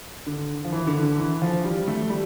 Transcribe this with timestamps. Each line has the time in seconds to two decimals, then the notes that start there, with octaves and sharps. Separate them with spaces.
0.27 D3
0.65 F3
0.72 E3
0.87 D3
1.03 D3
1.18 E3
1.42 F3
1.64 G3
1.88 A3
2.10 G3